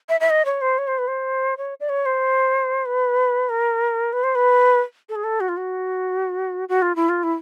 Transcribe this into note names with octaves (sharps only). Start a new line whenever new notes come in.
E5
E5
D#5
C#5
C5
C#5
C5
B4
C5
C#5
D5
C#5
C5
B4
A#4
B4
C5
B4
A4
G#4
A4
F#4
F4
F#4
F#4
F4
E4
F4
E4